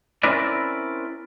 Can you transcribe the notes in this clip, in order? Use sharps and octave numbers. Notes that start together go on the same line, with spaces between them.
C4 C#4 E4 A#4 B4 D5